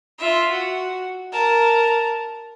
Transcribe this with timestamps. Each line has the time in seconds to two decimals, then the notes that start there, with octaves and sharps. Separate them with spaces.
0.19 F4 E5
0.51 F#4
1.32 A#4 A5